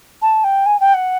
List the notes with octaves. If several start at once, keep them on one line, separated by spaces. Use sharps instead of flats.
A5
G5
G#5
G5
F#5